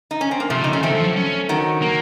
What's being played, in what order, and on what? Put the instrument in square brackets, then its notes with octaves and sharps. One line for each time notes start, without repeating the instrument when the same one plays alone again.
[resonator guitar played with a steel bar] D#4
C#4
C4
A#3
[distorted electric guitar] C3 [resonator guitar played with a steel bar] F3 A3
[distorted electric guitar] C#3
[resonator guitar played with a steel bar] D#4
[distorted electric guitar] C#3 [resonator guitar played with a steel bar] C#4
[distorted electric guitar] D#3 [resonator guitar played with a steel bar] A3 C4
[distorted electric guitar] F3
F#3
C#4
[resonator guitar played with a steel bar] D#3 F#3
[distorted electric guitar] A#3